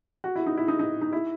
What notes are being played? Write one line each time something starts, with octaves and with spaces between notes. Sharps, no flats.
F#4
E4
D#4
E4
D#4
D#4
D#4
E4